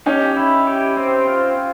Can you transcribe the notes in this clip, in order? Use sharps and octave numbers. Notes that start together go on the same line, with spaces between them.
C#4 D#4 G4
E4
G4
C4
F4